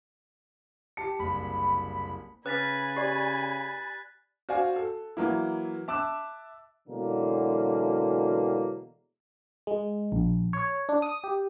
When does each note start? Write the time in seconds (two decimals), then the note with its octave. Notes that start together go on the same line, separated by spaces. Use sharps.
0.97 G4 A5 C#7
1.19 F#1 C2 B5
2.46 C#3 B4 G#5 B5 F#6 A6 B6
2.96 G4 D5
4.49 F#4 C5 D5 F5 G#5
4.76 A4
5.17 E3 F#3 A#3 E4
5.88 E5 A5 D6 E6 F#6 E7
6.88 B2 D3 E3 F#3 G#3 A#3
9.67 G#3
10.12 A#1
10.53 C#5
10.89 D4
11.02 D#6
11.24 G4